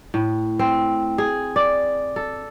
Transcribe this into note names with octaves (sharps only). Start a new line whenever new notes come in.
A2
C4
G#4
D5
A4